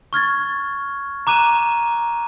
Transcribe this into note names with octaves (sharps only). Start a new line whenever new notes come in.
C#6 F6 G#6 A6
A#5 D6 F#6 D#7 E7